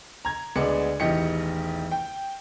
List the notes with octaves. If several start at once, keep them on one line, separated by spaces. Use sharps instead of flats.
A#5 G#6
D2 G#3 B3 D5 C#7
E1 A1 D#3 G4 D#5 C#7
G5